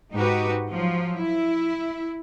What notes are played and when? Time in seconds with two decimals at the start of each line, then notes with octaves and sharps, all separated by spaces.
0.13 G#2 D#4 F#4 G4 B4
0.71 F3 F#3
1.16 E4